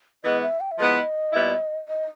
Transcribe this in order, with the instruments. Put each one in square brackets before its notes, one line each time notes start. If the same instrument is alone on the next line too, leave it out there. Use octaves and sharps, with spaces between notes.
[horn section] E3 G#3 B3 [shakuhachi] D#5
[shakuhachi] E5
G5
E5
[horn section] F3 G#3 B3 E4 [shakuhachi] D#5
[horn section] A#2 G3 B3 E4
[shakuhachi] D#5